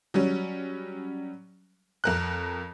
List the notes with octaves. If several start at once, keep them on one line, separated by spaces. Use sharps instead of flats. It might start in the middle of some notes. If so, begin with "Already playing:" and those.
F#3 G3 C#4
F2 A#4 F#6